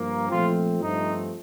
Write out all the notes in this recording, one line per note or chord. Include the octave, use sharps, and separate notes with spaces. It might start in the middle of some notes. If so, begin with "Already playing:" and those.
Already playing: G2 F3 A#3
A#2 F3 A3 C4 F4
G2 F3 A3 C4 D#4